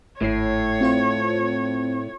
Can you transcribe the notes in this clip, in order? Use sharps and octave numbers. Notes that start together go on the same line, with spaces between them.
G#1 A2 C#5 C7
C4 F4 C5